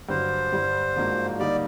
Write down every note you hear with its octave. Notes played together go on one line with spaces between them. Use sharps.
G2 D3 F#3 C5
G2 D3 G3
G#2 F3 A#3 D4 F#4
D3 G3 A#3 D#4 D5